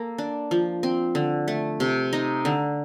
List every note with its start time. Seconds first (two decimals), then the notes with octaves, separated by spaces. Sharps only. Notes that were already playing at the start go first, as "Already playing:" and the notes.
Already playing: A#3 A4
0.18 D4
0.51 F3
0.83 C4
1.15 D3
1.48 A3
1.80 C3
2.13 D#4
2.45 D3